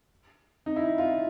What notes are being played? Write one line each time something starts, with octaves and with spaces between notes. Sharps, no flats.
D#4
E4
F4